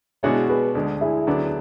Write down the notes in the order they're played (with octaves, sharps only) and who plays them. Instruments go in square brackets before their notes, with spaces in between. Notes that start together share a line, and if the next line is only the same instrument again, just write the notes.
[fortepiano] B2 G#3 D4 F#4 C#5 [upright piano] E4 G#4
[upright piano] G#4 B4
[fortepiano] D2 D3 G#3
[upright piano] E4 G#4
[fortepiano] D2 D3 F#3 B3 D4